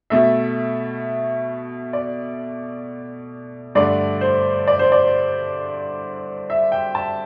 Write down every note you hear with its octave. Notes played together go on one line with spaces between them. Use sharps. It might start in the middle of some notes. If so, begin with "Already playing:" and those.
B2 A3 E5
D5
G2 D3 A3 D5
C5
D5
C5
D5
E5
G5
A5